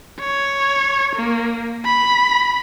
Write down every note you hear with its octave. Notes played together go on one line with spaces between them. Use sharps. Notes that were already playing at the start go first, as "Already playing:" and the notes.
C#5
A#3
B5